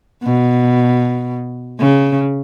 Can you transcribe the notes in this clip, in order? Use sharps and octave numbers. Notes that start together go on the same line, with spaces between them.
B2
C#3